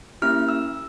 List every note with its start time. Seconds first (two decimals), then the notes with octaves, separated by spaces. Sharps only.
0.22 A#3 C#4 E4 G4 F6
0.49 E6